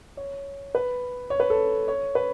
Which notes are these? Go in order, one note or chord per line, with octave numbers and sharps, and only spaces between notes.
C#5
B4
C#5
B4
A4
C#5
B4